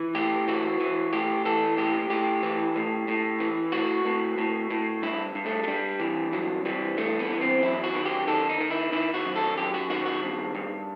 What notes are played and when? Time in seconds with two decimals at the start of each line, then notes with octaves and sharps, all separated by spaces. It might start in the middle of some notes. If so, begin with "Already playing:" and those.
Already playing: E3
0.15 A2 G4
0.48 E3 F#4
0.80 E3
1.13 A2 G4
1.45 E3 A4
1.78 A2 G4
2.10 A2 G4
2.43 E3
2.76 A2
3.08 A2
3.40 E3
3.72 A2 F#4
4.05 A2
4.38 A2
4.70 A2
5.02 G2 E4
5.35 G2
5.46 A3
5.64 A3
5.68 G2 G3
6.00 E3
6.32 G2 F#3
6.65 E3 G3
6.97 G2 A3
7.19 B3
7.30 E3
7.41 C4
7.62 F#2 E4
7.84 F#4
7.95 D#3
8.05 G4
8.27 D#3 A4
8.49 D#4
8.61 D#3
8.70 E4
8.92 D#3 E4
9.14 F#4
9.25 F#2
9.36 A4
9.58 F#2 G4
9.74 F#4
9.90 D#3 F#4
10.06 F#4
10.22 G2
10.55 G2